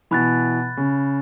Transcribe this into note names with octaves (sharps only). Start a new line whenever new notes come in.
B2 E3 B5 F#6 A6
C#3